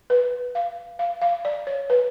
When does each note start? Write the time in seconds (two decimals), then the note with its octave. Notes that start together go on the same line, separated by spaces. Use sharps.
0.10 B4
0.55 F5
0.99 F5
1.22 F5
1.45 D5
1.67 C#5
1.90 B4